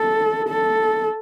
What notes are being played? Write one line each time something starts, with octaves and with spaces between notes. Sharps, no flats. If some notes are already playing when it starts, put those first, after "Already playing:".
Already playing: A4
A4